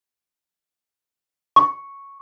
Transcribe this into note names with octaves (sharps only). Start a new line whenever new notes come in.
C#6